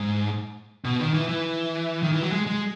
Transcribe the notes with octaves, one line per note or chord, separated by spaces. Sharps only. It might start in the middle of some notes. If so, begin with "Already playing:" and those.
Already playing: G#2
B2
D#3
E3
E3
D#3
E3
F#3
G#3
G#3